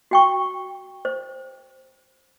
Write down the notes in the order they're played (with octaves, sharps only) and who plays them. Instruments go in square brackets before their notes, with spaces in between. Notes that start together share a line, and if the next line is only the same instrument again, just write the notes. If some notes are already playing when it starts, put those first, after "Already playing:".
[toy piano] F#4 G5 C#6
C5